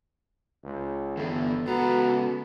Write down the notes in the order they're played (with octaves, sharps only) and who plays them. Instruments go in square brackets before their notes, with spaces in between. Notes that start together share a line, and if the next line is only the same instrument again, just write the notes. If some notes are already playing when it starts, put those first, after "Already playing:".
[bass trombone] C#2
[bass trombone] G1 [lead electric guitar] E3 B3 [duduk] A4
[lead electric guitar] C#2 A#5 [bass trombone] B3 [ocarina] F#4